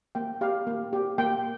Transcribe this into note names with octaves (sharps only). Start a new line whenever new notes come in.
A#3 G5
G4 F5
A#3
G4
A#3 G5